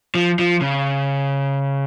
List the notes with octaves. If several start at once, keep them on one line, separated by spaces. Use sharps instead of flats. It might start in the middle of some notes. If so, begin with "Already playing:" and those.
F3
F3
C#3